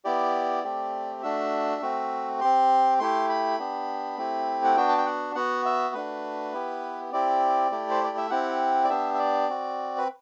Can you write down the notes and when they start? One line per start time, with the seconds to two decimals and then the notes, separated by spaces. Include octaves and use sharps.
0.05 B3 E4 G4 D5
0.64 A3 C4 G4
1.22 A3 D4 F#4 E5
1.82 A3 C4 F#4
2.40 C4 G4 C6
3.00 A3 E4 G4 C6
3.29 B5
3.59 B3 D4 G4
4.17 A3 C4 E4 G4
4.64 F#5
4.76 B3 D4 F#4 G5
4.88 A5
4.98 G5
5.06 F#5
5.35 B3 F#4 F#5
5.66 E5
5.94 A3 D4 F#4 B4
6.53 B3 E4 G4
7.12 C4 E4 G4 D5
7.71 A3 E4 G4
7.90 C5
8.04 D5
8.17 E5
8.30 C4 E4 G4 F#5
8.84 D5
8.89 B3 D4 G4 E5
9.14 E5
9.19 D5
9.49 C4 F#4
9.98 B4